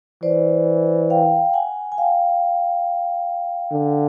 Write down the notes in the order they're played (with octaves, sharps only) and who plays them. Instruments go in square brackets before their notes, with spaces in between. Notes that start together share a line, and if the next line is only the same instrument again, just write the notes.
[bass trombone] E3 [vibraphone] C5 D5
[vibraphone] F5 G5
F#5 G#5
G#5
F5 G5
[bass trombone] D3